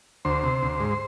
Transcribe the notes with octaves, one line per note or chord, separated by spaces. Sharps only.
D2 C5
C3
D2
G#2